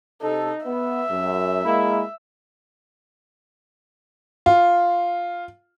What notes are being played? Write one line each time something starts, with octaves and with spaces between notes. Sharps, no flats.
C3 D#4 A4
B3 E5
F#2
G#3 A#3 E4
F4